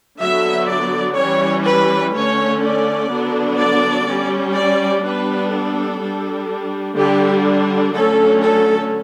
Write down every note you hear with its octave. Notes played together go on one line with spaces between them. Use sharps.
D3 F#3 B3 E5
D5
E3 G3 C#4 C#5
B4
D3 A3 C#4 C#5
D5
D3 F#3 B3 D4
D5
G3 C#4
D5
G3 B3 D4 B4
A4
G3 D4
D3 G3 D4 G4
D3 F#3 A3 C#4 A4
A4